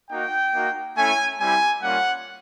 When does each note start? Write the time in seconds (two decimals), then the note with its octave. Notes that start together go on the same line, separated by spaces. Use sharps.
0.10 A#3 D#4 F#4 G5
0.54 A#3 D#4 F#4
0.97 A3 C#4 E4 G#5
1.40 G3 C4 E4 G4 G#5
1.83 G3 A#3 C#4 F4 F#5